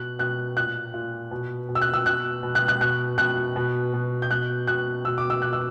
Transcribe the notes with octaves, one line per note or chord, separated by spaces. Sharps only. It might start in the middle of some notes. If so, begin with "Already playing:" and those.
Already playing: B2 F#6
B2 F#6
A#2 F#6
A#2
B2
B2
E6
F#6
E6
B2 F#6
B2
F#6
F#6
B2 F#6
B2 F#6
B2
B2
G6
B2 F#6
B2 F#6
B2 E6
D6
E6
B2 F#6
E6